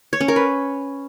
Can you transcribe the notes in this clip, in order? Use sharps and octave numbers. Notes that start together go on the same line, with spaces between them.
C#5
C#4
A#4
B4